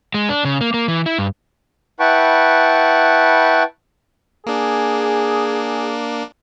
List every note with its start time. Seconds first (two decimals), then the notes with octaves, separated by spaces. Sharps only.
0.14 G#3
0.29 D4
0.45 C#3
0.61 A#3
0.74 A#3
0.88 E3
1.06 E4
1.18 G2
2.00 E4 B4 F#5 G5 A5 C#6
4.46 A#3 D4 G#4